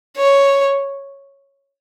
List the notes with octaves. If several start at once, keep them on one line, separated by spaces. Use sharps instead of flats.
C#5